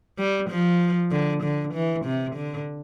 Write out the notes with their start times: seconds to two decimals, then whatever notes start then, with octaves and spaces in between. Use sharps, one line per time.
0.18 G3
0.50 F3
1.11 D3
1.43 D3
1.74 E3
2.05 C3
2.36 D3